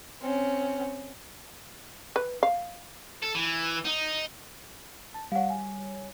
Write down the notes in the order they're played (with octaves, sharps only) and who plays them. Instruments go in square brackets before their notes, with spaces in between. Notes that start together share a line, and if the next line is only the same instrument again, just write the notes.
[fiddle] C4 C#4
[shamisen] B4
F5
[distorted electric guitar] A4
E3
D#4
[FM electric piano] A5
[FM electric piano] G3 C#5 [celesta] F5 F#5
[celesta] G#5